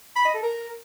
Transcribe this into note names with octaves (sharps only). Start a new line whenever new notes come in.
B5
D#5
A4
A#4